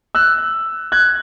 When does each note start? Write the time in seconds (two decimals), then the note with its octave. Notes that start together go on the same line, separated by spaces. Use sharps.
0.15 E6 F#6
0.92 F#6 G#6